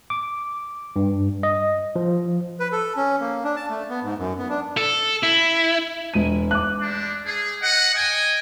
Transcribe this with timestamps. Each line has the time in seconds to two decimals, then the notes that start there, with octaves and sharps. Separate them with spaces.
0.10 D6
0.96 G2
1.43 D#5
1.96 F3
2.60 B4
2.72 A4
2.97 C#4
3.21 A#3
3.44 D4
3.56 A5
3.69 A3
3.89 B3
4.03 G#2
4.18 F#2
4.38 B3
4.49 D4
4.77 A4
5.23 E4
6.14 E1 D#7
6.51 D6 F#6
6.81 G3 G#3 D4
7.25 A3 G#4
7.61 D#5 F#5
7.94 D#5 G5 G#5